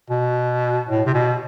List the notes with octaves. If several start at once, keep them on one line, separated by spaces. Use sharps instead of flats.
B2
A2
C3
B2